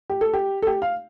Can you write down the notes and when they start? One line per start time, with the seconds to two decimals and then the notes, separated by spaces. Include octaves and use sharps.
0.10 G4
0.21 A4
0.33 G4
0.62 A4
0.67 G4
0.82 F5